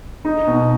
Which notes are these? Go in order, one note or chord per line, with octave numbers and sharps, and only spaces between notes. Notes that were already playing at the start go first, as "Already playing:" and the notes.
D#4
B2